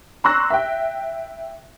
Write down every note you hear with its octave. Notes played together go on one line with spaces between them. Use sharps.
A#5 C6 C#6 E6 F#6 A#6
E5 G5